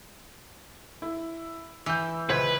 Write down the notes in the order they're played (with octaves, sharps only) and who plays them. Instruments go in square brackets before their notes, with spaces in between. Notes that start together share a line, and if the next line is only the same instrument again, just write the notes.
[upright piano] E4
[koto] E3 [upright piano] E6 G6
[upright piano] C#2 C5 G#6 [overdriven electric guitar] B4